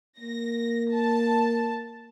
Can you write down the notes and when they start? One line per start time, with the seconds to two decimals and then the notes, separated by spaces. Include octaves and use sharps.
0.20 A#3 A#6
0.92 A5